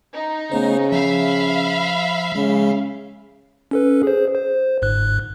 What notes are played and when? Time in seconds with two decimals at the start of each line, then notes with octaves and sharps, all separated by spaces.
0.14 D#4
0.52 C#3 A3 B3 C5
0.92 F3 E5 F5 B5
2.35 C#3 G#3
3.71 C#4 A4 B4
4.03 G#4 C5
4.35 C5
4.82 G1 G#2 F#6